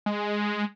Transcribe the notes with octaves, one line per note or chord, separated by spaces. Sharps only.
G#3